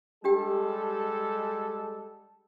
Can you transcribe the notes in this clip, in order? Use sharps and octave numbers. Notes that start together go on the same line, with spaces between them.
G3 G#3 D4 G4 A4 G5